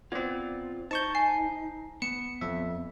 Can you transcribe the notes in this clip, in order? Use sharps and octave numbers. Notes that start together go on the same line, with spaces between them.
B3 C4 F4 D5 G#6
D#4 C5 A5 C#6 G6
G#5 A5 C7
B3 C#7 E7
F2 E5